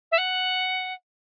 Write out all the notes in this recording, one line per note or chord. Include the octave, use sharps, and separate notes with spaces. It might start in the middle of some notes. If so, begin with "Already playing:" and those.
E5
F#5